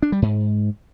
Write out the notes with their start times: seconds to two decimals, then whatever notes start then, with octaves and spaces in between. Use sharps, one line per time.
0.02 D4
0.12 G3
0.22 G#2